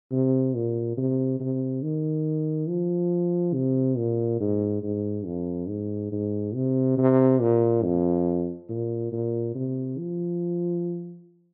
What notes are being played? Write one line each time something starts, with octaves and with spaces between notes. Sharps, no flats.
C3
A#2
C3
C3
D#3
F3
C3
A#2
G#2
G#2
F2
G#2
G#2
C3
C3
A#2
F2
A#2
A#2
C3
F3